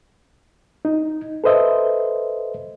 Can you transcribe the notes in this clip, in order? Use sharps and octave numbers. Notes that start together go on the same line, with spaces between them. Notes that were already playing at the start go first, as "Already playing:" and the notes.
D#4
A4 B4 C5 D#5 E5